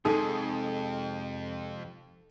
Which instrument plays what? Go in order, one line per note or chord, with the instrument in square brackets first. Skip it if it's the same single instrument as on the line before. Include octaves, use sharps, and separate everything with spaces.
[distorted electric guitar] F2 [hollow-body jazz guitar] C3 G#3 G#4 [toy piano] D#4 [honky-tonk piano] A4 D#6